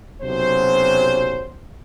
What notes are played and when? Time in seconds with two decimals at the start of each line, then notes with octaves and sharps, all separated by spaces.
0.22 B1 C3 F#3 C#4 C5